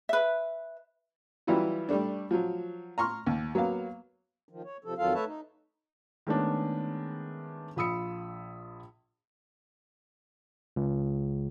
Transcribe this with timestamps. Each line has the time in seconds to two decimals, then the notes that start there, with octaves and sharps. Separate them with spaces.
0.09 B4 E5
1.47 E3 F#3 G3 E4 F4
1.89 G3 A3 D4
2.31 F3 F#3
2.98 A#5 C6 C#6 F6
3.27 D#2
3.55 F#3 A#3 B3 F5
4.49 D#3 F3
4.64 C#5
4.85 C3 F3 A4
4.98 F2 D#3 F#3 F4 A4 F5
5.14 A3 B4 C#5 E5 A5
5.26 D#4
6.27 D#3 G#3 A3 B3 C#4 D4
7.76 A#1 F4 B5 D#6 E6 C#7
10.76 C#2